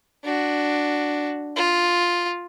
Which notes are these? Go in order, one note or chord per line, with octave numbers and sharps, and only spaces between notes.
D4 F#4
F4